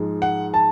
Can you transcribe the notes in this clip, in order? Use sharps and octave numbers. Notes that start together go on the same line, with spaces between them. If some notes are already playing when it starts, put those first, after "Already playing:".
Already playing: G#2 F3 G#3
F#5
A5